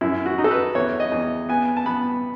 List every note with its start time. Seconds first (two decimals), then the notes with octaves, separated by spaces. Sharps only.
0.01 F#2 E4
0.26 F#4
0.38 D#4
0.44 A4
0.51 B4
0.75 E2 C#5
1.00 D#5
1.12 E2
1.49 B3 G#5
1.77 A5
1.86 B3 B5